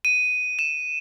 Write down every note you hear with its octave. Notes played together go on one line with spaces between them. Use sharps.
D#7
E7